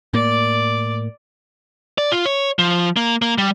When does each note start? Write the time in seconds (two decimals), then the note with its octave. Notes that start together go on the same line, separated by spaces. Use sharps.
0.14 A2 A#3 D5 D6
1.98 D5
2.12 F4
2.25 C#5
2.59 F3
2.97 A#3
3.22 A#3
3.38 G3